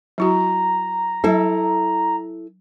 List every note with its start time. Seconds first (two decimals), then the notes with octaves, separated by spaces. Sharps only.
0.18 F#3 E4 F#4 A#5
1.24 F#3 E4 A4